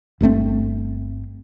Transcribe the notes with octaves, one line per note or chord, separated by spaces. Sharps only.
G1 G2 A3 C4